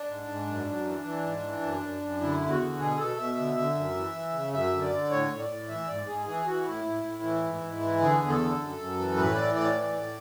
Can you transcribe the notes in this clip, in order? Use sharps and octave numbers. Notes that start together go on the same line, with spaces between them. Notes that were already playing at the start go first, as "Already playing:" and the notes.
Already playing: D4
G#2
G#2
F#2
F#2
E3
E3
G#2
E3
F#2
F#2
F#2
D3 E4
E2
F#4
D3
B2 G#4
B2 A4
B2 E5
D3
D3
F#2
E3
E3
C#3
F#2 E5
D3
D5
D3
A2 C#5
A2
D5
A2
E3 E5
G#2 D5
G#2 G#4
E3 G#4
E3 F#4
A2 E4
A2
A2
E3
G#2
G#2
E3
D3 G#4
E2
A4
D3
F#2
F#2
E3
A2 B4
E3 D5
A2 D5
E3
A2